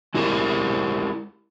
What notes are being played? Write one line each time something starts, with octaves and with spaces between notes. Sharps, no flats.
G#3 E4 G4 A#4